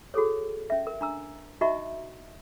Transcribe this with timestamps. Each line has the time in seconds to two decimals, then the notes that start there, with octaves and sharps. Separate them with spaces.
0.14 F#4 G#4 A4 C#5
0.70 C#4 E5
0.87 A#4
1.01 D4 A#5 E6
1.61 D#4 F#4 D#5 E5 A#5 C#6